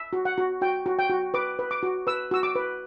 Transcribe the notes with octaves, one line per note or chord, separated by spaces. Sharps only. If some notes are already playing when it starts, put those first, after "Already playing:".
Already playing: E5
F#4
F#5
F#4
F#4 G5
F#4
G5
F#4
B4 D6
B4
D6
F#4
B4 E6
F#4 E6
D6
B4